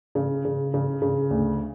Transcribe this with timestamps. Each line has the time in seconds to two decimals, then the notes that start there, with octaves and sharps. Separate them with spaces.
0.15 C#3
0.45 C#3
0.74 C#3
1.02 C#3
1.30 D2